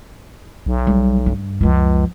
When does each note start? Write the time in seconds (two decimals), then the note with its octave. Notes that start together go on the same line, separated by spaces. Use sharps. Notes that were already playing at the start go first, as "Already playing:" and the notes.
0.66 B1
0.87 G3
1.26 G2
1.61 C#2 F#2 F3